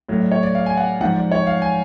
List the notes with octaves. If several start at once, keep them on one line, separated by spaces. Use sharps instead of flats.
A2 F#3
D5
C#5
D5
F5
G#5
F#5
G#2 F3 F#5
D5
C#5
F5
G#5